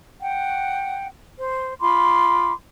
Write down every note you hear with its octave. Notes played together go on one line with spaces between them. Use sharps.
F#5 G5
C5
F4 B5 C6 D6